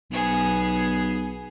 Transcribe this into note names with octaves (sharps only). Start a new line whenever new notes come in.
B1 B3 G#4